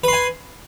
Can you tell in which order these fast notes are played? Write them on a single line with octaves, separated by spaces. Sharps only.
B4 C6 G#5